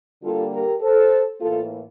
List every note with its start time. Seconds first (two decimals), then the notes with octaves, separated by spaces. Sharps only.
0.22 D3 G3 A#3 F4 A4
0.51 G4 A#4
0.81 A4 C5
1.40 A2 E3 A#3 F4 A4